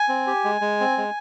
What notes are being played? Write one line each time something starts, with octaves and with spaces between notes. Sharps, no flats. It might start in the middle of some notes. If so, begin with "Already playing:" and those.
Already playing: G#5
C4
G4
G#3
G#3
C4
G#3